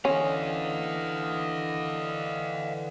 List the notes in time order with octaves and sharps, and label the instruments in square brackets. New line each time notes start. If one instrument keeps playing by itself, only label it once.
[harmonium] D3 E3 [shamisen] C#4 [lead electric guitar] D#5 F5